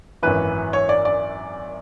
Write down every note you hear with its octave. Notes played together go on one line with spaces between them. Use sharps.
G#1 F#2 E3 B4
C#5
D5
D5